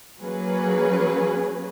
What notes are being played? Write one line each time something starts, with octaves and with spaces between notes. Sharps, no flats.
F#3 A#3 C#4 G#4 B4